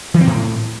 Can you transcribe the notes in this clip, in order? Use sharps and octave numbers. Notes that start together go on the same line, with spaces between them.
E3
C4
A2